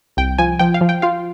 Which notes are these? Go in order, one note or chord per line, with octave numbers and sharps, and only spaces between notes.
C2 G5
F3 G#5
F3 G5
F5
F3
G5
F4 F5